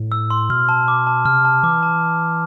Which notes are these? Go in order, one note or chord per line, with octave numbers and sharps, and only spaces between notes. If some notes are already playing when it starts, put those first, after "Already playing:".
Already playing: A2
E6
C6
B2 F6
A5
D6
A5
C3 F6
A5
E3 D6
A5